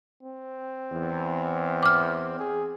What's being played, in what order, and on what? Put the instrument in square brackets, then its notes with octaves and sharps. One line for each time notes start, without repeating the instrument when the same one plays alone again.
[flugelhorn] C4
[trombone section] E2
[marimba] D6 F6
[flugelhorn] G#4